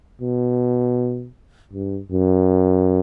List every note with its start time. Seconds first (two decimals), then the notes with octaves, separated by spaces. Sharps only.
0.22 B2
1.73 G2
2.12 F#2